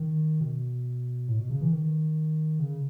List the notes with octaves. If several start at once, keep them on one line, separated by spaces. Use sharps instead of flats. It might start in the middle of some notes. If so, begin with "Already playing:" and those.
Already playing: D#3
B2
A2
B2
C#3
E3
D#3
C#3